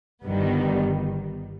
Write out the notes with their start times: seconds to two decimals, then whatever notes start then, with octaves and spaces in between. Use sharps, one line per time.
0.24 G1 G2 D#3 G3 B3